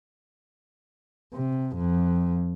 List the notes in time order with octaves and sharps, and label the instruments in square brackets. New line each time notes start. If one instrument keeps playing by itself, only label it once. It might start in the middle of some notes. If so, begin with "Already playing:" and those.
[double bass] C3
F2